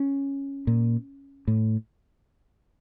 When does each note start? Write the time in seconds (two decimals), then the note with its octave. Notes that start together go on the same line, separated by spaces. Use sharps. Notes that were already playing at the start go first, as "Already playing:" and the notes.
Already playing: C#4
0.67 A#2
1.47 A2